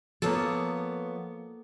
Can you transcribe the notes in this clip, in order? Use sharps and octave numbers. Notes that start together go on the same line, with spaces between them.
F3 A#3 B3 A4 C#5